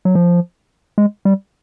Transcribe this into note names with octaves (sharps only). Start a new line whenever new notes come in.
F#3
F3
G#3
G3